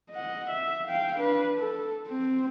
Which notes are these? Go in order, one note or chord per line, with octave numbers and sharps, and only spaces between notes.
D#5 F#5
E5
F5 G5
D4 B4
A4
C4